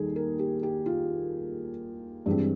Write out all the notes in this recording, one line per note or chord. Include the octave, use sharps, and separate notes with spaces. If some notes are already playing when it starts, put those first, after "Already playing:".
Already playing: D#2 D#3 G3 G#4 A4
A#4
G4
G4
F4
G2 E3 G#3 C4